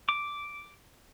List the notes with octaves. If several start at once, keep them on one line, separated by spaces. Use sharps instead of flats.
D6